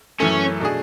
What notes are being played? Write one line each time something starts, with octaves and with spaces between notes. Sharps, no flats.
F#2 E3 A3 C#4
B2 A3 D4 G#4